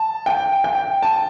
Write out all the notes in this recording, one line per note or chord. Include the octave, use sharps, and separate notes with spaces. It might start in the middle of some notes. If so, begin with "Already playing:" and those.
Already playing: A5
G5
G5
A5